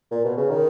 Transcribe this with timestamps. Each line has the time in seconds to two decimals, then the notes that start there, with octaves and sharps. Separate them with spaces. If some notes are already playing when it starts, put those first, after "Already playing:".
0.11 A#2
0.24 B2
0.37 C#3
0.50 D#3